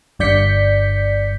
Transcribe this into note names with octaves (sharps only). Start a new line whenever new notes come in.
G1 G2 D5 G6 B6 C#7